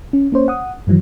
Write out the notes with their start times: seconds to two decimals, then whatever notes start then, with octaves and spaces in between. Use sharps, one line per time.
0.13 C#4
0.32 A#3 C#4 C5 C#5
0.48 F#5 D#6
0.87 G2 D#3 E3 F#3